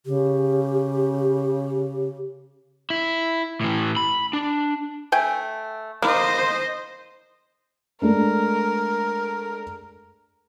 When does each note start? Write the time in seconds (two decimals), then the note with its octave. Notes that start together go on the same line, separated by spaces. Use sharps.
0.06 C#3 G4
2.90 E4
3.61 A2 E3
3.97 B5
4.33 D4
5.12 A3 G5 G#5
6.02 A#3 C5 D#5
8.02 G#3 A3 D4 A#4